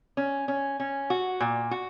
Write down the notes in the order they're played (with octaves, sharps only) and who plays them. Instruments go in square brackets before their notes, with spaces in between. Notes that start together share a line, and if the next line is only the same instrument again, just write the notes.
[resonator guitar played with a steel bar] C#4
C#4
C#4
F#4
A#2
F#4